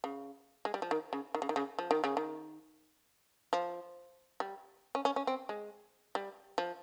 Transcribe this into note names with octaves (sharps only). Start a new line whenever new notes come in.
C#3
G#3
G3
F3
D#3
C#3
D#3
C#3
D#3
C#3
F3
D#3
C#3
D#3
F3
G3
C#4
C#4
C#4
C4
G#3
G3
F3